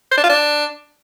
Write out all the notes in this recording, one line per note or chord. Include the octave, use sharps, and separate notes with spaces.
C5
D4
F4
D4